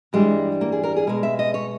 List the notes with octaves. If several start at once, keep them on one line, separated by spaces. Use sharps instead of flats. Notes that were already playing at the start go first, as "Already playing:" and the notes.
G2 E3 G3 G#3
A#3
G#4
A#4
G#4
B2 G#3 A#4
E5
D#5
C#5